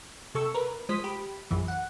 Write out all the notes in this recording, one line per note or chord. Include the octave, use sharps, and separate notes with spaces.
C3 A4 C#6 E6
A#4 B4
F3 G#3 C5 D#6 B6
G4 B5
A#1 F#2 E3
F#5